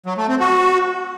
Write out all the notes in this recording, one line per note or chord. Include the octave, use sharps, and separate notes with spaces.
F#3
A3
C4
F#4